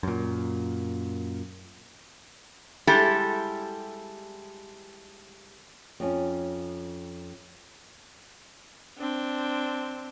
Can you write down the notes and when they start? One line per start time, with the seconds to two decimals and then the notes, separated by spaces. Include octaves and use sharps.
0.03 F#2 A#2
2.87 G3 G#3 E4 G4 A4
6.00 F2 C#4
8.98 C4 D4